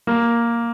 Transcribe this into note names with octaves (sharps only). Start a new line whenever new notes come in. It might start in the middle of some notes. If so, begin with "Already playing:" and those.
A#3